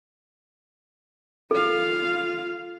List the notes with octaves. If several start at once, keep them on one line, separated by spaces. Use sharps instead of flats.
F4 A4 F5